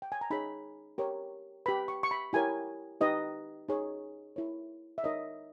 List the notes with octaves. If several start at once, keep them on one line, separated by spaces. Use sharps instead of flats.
G5
G#5
A#5
D#4 G#4 C#5 B5
G4 A#4 C#5
G4 B4 B5
C#6
C#6
B5
E4 G4 A#4 C#5 G#5
D#4 G4 B4 D#5
D#4 G#4 C#5
E4 A#4 C#5
E5
D#4 A#4 C#5 D#5